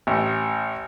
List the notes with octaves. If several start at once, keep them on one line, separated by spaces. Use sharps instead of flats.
A1